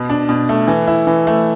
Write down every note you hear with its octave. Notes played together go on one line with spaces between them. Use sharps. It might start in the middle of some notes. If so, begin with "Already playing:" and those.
Already playing: B2
D4
B2
A3
E3
E4
E3
A3